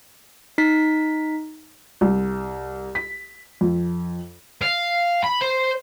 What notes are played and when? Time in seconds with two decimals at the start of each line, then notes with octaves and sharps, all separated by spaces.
0.58 D#4 B6
2.01 C2
2.95 B6
3.61 F2
4.62 F5
5.23 B5
5.41 C5